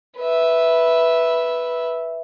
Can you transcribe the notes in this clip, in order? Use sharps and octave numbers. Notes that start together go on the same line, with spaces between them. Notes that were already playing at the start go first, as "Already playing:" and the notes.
B4 E5